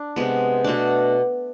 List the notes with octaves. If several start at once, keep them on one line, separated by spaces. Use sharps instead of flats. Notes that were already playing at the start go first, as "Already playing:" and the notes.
Already playing: D4
C3 G#3 B3
B2 A3 D4